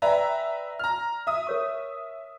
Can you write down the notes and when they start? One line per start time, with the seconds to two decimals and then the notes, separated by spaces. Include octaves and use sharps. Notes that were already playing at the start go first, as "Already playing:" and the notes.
0.02 B4 D5 E5 G5 G#5 A#5
0.79 A#5 F6
1.27 E5 D#6
1.47 A#4 C#5 C#6